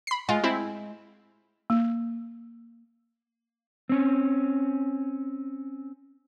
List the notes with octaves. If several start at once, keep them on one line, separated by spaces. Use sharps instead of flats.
B5 C7
G#3 F4
C4 E4
A#3
C4 C#4